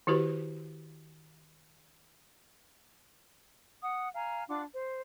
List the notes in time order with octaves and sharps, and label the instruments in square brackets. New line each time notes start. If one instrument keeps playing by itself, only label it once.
[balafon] D#3 E4 F#4 G4 B4
[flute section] F#5 D#6
F5 G#5 A#5
D4 F4 F#5 D6
C5